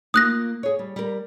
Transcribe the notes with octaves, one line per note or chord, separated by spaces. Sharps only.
A#3 F4 D#6 F#6 A#6
G#4 C#5
G3
G3 A#4